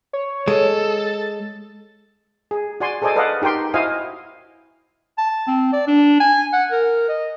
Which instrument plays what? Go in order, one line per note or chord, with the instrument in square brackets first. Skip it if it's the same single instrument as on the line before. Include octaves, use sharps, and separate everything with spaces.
[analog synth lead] C#5
[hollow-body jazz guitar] G#3 [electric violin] A4
[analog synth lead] A6
[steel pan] G#4
F#4 D5 G#5 C6
G#4 A4 C5 D5 D#5 G#5
A4 B4 D5 D#5 F5 F#5
D#4 G4 A#4 G5 C6
E4 F#4 C5 D#5 F5 G#5
[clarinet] A5
C4
D5
D4
G#5
F#5
A#4
D#5